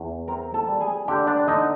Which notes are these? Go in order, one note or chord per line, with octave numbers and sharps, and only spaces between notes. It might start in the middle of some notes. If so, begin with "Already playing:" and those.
Already playing: E2
C4 A#4 A#5
A4 A5
G3
G#4 G#5
D3 G4 G5
D4 D5
D3 D#4 D#5